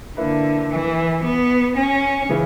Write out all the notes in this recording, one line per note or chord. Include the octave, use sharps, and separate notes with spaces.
D3 A#3 E4 B4
E3
B3
C#4
C#3 E3